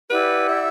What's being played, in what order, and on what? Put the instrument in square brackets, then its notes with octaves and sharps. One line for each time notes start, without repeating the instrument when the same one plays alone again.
[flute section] E4 G4 D5 F#5 [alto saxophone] B4
[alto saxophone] E5